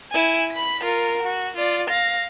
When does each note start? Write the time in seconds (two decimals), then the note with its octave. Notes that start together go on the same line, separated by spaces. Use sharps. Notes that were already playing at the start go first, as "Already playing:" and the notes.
0.11 E4 G#5
0.52 B5 B6
0.83 F4 A#4
1.22 F#4
1.56 F4 D5
1.89 F5 A#6